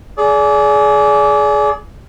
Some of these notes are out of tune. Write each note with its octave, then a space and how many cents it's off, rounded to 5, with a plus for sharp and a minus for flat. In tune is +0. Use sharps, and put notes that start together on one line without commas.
G#4 +25 D5 -25